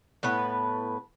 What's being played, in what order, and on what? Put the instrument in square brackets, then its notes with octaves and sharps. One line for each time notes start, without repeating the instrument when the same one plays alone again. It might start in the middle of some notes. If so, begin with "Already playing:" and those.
[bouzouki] A2 B3 B4